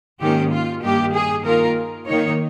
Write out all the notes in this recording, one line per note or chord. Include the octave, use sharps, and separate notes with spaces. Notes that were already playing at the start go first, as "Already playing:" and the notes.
G#2 D#3 A#3 C#4 G4
F4
G2 D#3 A#3 G4
G#4
D#3 A#3 F4 A#4
D#3 A#3 D#4 C#5